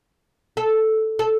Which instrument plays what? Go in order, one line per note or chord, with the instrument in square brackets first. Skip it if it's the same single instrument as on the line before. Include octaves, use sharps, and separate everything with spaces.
[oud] A4
A4